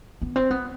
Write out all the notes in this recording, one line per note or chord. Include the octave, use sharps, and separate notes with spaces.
B3
C4
B3